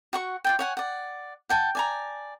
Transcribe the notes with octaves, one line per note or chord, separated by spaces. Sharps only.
F#4 F#5 C#6
F4 D5 G5
C#5 F#5 G#5
D5 F#5
F#5 G5 A5
D5 G#5 A#5